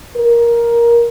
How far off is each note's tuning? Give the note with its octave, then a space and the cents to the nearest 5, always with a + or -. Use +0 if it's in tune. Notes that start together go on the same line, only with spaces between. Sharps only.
A#4 +10